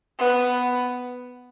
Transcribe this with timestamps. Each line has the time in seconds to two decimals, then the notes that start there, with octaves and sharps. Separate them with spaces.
0.19 B3